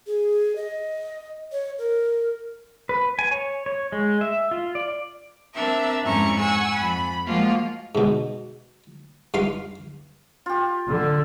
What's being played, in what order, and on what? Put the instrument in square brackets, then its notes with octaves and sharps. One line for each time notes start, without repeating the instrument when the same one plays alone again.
[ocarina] G#4
D#5
C#5
A#4
[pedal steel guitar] B4
G#5
C#5
C#5
G#3
E5
F4
D5
[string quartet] C4 D4 A#4 E5
F2 G#2 C#4 E4 A#5 C#6
F#5 G#5 C#6 E6
F2 B5
F3 G#3 A#3 F4 F#4
[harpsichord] G#2 B2
G2 F4 F5 C6 D6
[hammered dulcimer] F4 G4
[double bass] D3